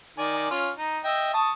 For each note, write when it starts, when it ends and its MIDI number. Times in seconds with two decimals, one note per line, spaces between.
0.18 0.50 51
0.18 0.50 74
0.18 0.50 80
0.50 0.69 61
0.50 0.69 65
0.78 0.99 63
1.04 1.29 75
1.04 1.29 76
1.04 1.29 79
1.34 1.50 81
1.34 1.50 85
1.34 1.50 87